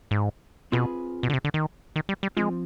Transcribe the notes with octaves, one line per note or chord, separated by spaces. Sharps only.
G#2
B2 C4 F4 G#4 B4
B2
D3
C3
D3
D#3
D#3
G3
G3
F3 G#3 C4 F4